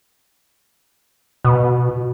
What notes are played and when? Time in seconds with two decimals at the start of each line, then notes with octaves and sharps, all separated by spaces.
1.45 B2